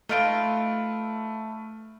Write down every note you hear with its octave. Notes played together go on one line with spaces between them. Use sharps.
A3 D#4 F4 B4 F6 D7